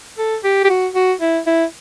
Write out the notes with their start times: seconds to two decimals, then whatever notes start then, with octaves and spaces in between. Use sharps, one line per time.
0.18 A4
0.44 G4
0.64 G4
0.70 F#4
0.95 F#4
1.21 E4
1.47 E4